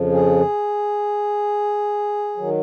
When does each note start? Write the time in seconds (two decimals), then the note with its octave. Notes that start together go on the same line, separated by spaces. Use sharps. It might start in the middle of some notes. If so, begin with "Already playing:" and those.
Already playing: F2 C#3 F3
0.12 G#4
2.37 D#3 F#3